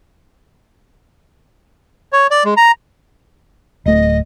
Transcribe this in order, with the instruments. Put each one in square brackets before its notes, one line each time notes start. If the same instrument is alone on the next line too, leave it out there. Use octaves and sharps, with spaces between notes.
[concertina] C#5
D5
G#3
A#5
[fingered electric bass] D1 A3 [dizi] D#5